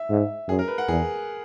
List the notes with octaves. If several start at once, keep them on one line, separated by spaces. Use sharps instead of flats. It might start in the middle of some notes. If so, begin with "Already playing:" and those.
Already playing: E5
G#2
F#2 G#4
A#4
B4
F#5
E2 G#4